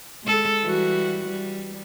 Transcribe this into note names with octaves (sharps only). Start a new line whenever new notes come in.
G#3 A4
E3 G3 F#4
G3